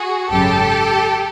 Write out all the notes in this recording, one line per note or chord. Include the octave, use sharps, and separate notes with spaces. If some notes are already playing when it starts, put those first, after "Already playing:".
Already playing: F#4 G#4
G#1 F#2 C#3 G4 A4